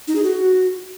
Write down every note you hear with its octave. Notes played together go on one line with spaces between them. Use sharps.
D#4
G#4
F#4